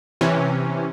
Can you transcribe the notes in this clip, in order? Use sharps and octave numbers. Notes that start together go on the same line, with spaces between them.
C3 E3 C#4